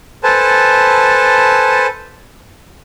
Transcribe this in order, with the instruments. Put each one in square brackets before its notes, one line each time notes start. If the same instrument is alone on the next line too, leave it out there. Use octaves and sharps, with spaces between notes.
[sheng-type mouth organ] A4 B4 C5 G#5 A5